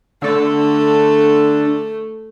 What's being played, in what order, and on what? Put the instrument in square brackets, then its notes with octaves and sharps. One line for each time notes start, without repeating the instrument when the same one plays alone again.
[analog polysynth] D3 A4 [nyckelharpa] A3